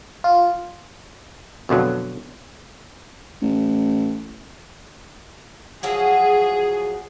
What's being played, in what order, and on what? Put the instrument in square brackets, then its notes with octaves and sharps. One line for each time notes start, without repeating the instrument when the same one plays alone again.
[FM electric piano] F4
[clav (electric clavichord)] F2 B2 D3 F#3
[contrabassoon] A1
[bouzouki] F3 F#3 F#4 [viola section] G#4